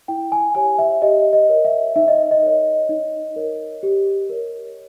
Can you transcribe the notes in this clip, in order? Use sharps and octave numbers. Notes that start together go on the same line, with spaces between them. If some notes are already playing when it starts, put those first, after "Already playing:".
E4 G5
G#5
G4 C#5 G#5
E5
G4 D#5
D#5
A#4 C#5
E5
D#4 E5
D#5
D#5
A#4 C#5
D#4
A#4 C#5
G4
A#4 C#5